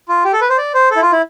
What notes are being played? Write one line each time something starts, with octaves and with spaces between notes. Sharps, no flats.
F4
G4
A4
B4
C5
D5
C5
A4
E4
F4
E4